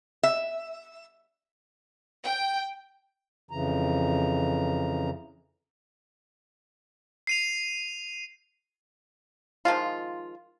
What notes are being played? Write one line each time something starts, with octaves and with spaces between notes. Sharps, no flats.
E5
G5
F2 C#3 E3 A#5
C7 D#7 F7
D#3 F3 G#3 F4